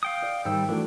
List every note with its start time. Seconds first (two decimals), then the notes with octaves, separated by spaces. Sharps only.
0.03 F5 G5 D#6
0.22 D5
0.45 G#1 G3 G5 E6
0.69 E3 A3 D4 F#4